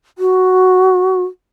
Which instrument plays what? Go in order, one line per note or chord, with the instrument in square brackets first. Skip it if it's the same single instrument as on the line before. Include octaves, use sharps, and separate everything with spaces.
[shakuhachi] F#4